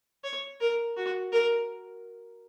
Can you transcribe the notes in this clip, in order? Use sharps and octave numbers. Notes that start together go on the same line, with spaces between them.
C#5
A#4
F#4
A#4